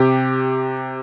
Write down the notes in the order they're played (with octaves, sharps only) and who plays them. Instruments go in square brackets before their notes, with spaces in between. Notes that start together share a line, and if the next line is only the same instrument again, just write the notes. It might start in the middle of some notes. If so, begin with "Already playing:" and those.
Already playing: [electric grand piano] C3 G4